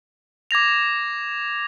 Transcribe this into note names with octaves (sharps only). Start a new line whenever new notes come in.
D6 G#6 A#6 F7